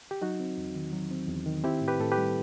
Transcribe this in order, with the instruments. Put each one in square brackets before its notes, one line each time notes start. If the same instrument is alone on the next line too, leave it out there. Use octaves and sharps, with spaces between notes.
[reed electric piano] G4
F#3 D#4 F#4
C4
E2
D#3
F#3
C4
E2
D#3
C4 E4 G4
A2
G4 B4
A2 A4
G4 B4
G3